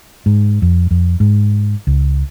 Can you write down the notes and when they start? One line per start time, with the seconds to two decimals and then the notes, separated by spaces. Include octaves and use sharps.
0.26 G#2
0.62 F2
0.91 F2
1.20 G#2
1.87 C#2